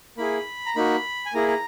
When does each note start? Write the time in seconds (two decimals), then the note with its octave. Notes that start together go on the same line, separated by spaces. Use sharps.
0.17 A#3 E4 G#4 B5
0.66 A#5
0.75 A#3 D#4 F#4 B5
1.26 G#5
1.34 A#3 E4 G#4 A#5
1.48 A#5